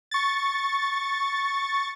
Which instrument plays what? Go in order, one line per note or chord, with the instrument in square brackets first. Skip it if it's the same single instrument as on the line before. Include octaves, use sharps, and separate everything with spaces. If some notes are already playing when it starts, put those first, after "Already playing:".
[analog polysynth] C#6 A6